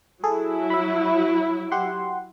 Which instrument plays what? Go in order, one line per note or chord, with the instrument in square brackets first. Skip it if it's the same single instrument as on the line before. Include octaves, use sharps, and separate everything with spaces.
[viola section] F#3 E4 [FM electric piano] G#4 A4
[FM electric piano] E5 B5
G4 F#5 C6